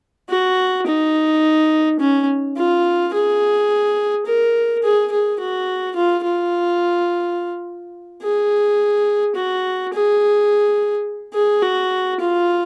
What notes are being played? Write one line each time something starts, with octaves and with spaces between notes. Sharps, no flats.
F#4
D#4
C#4
F4
G#4
A#4
G#4
G#4
F#4
F4
F4
G#4
F#4
G#4
G#4
F#4
F4